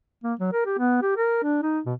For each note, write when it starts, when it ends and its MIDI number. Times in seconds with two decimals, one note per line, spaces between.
0.24 0.34 58
0.40 0.51 54
0.53 0.63 70
0.66 0.76 67
0.78 1.00 59
1.02 1.13 67
1.17 1.40 70
1.43 1.60 62
1.62 1.80 63
1.86 1.94 47